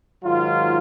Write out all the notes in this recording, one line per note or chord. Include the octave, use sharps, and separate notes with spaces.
G#2 D#3 F#3 F4